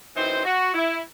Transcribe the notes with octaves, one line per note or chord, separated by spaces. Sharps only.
F#2 E3 C4 D#4 C5
F#4
E4